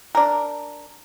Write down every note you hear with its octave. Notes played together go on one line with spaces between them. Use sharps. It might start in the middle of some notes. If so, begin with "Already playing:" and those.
D4 A#4